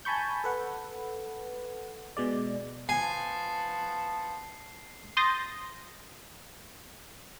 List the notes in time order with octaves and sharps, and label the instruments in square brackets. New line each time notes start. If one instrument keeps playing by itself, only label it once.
[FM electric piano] G#5 A5 B5 C#6 G6
A4 B4 F#5
B2 G#3 D5
[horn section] F3 B3 A5 [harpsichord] G#5 [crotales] C7
[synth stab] C6 D#6 G6 A6 A#6